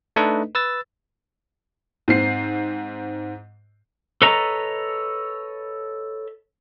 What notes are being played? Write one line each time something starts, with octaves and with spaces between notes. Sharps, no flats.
A3 D4 D#4 A4 B4 D#5
B4 E6 A6
G#2 C4 C7
A4 B4 C#5 D#5 A#5